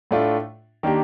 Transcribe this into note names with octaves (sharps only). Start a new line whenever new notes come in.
A2 A3 D4 F4
D#3 A#3 D4 G4